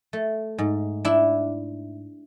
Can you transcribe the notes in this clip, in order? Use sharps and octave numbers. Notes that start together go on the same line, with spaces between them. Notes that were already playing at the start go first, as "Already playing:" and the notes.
A3
G#2
D4 E4